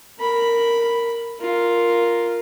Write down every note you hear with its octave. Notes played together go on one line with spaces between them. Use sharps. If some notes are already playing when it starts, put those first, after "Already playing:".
A#4 B5
F4 A#4